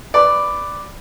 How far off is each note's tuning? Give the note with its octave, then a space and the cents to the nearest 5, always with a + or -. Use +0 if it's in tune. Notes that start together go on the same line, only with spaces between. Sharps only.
B4 +10 D5 +0